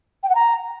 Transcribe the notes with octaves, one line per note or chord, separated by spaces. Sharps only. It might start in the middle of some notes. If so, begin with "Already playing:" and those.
G5
F#5
A#5